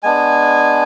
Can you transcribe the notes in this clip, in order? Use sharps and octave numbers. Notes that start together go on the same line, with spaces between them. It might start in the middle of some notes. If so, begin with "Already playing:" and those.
G#3 B3 D4 G#5